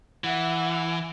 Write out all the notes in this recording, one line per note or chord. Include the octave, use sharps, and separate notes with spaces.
E3 E5 F#5